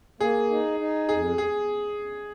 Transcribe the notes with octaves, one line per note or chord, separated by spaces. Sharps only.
A#3 G#4
D#4
D#4
F2 G#4
G#4